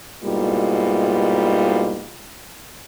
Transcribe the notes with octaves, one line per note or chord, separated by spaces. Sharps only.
G#2 B2 G3 A#3 E4 F4